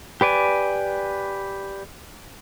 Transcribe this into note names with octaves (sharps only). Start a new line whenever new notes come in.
G4 B4 D5 G#5